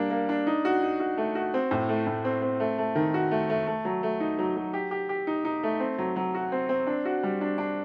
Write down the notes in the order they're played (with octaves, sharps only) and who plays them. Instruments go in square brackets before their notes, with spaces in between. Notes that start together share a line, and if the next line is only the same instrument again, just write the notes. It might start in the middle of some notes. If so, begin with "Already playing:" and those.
Already playing: [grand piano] G3 A#3 D4
A#3
D4
D#4
F#4
D#4
F#4
A3
F#4
C4
A2
A3
A2
C4
C4
A3
A3
D#3
F#4
A3
A3
A3
F#3
A3
D#4
F#3
F#3
G4
G4
G4
D#4
D#4
A3
C4
F#3
F#3
F#4
C4
C4
D4
F#4
G3
D4
D4